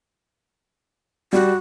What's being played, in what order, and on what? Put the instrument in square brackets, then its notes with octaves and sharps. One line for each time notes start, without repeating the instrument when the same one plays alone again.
[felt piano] G3 [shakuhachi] F#4